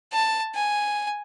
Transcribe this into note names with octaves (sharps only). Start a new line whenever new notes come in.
A5
G#5